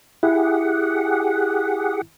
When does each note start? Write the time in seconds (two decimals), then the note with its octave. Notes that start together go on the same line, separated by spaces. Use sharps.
0.23 E4 G4 G#4 F#5